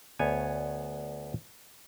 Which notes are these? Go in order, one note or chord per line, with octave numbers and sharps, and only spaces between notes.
D2 B3 C#5 G#5